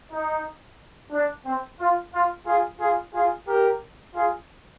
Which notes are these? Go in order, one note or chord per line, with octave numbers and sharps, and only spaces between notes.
D#4
D4
C4
F4
F4
F4 G#4
F4 G#4
F4 G#4
G4 A#4
F4 G#4